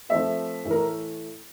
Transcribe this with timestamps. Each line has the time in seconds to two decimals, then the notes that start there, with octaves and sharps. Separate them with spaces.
0.09 F3 A3 C4 E5
0.65 A2 E3 A3
0.71 A#4